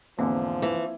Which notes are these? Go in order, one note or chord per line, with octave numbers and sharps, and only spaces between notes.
E2 G#2 D3 F3 A#3 C4
E3